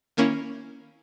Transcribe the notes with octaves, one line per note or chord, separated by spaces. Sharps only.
D#3 A#3 C#4 E4